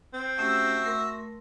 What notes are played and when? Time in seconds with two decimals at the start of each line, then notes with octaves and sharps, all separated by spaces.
0.13 C4
0.38 A3 C#4 F#4 G4 E5 E6
0.84 A3 A#4 C6